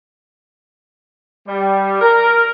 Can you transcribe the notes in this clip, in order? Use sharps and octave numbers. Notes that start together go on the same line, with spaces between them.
G3
A#4